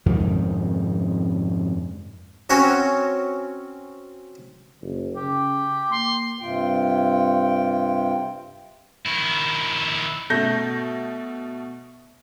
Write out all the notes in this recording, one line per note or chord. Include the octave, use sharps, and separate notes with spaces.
F2 G#2 C3 D#3
C4 C#4 F#4 A#4 C#5
F#1
C#3 G4
A#3 C6
G2 C3 F4 G5
D#3 E4
B2 A3 G6 A#6